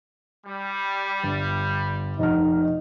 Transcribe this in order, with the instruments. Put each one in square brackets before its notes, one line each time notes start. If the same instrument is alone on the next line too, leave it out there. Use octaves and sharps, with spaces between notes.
[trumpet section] G3
[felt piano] G1
[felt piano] F1 F#5 F6 [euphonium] D#4